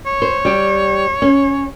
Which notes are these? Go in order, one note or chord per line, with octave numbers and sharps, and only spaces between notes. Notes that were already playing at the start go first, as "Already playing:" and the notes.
C#5
C5
G3 G4
C#4